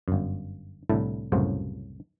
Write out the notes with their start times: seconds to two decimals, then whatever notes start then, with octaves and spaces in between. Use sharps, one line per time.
0.08 G1 F#2
0.90 C2 A2 D3 E4 A5
1.32 C2 F#2 A2 C#3 F#4 C5